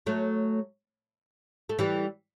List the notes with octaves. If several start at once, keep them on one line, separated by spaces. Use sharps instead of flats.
F#3 A3
A3
E3 G3